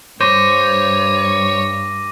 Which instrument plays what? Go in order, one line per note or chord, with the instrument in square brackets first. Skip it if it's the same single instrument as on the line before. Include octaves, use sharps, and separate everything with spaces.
[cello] G2 [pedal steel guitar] C5 [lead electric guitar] C#5 [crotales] D6 A#6 D#7